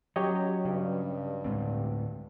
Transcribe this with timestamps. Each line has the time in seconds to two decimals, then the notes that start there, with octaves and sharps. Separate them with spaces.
0.16 F#3 C#4 G4 C#5 D#5
0.65 G2 C#3
1.44 D2 A2 G#3 C4